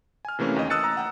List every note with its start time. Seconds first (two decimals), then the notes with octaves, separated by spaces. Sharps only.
0.25 G#5 F6
0.39 C3 E3 A3 A#3 C#4
0.56 D#2 D#5
0.70 D#6 E6 F#6 A6 C#7
0.84 A#5
0.97 F#5 G5